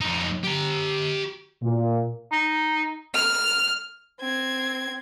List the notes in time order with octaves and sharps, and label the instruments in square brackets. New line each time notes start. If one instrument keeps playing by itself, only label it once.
[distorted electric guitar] F2 D#4
G4 A#5
[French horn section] A#2
[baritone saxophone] D#4
[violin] F6
C4 G#6